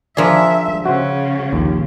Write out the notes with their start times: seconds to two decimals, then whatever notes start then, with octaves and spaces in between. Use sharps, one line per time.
0.17 F3 D4 G#4 A#4 D5 E5
0.86 C#3 F#4 C5
1.52 A#1 D#2